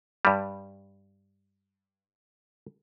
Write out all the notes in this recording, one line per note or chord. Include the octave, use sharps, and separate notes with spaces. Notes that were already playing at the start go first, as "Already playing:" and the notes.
G2 G3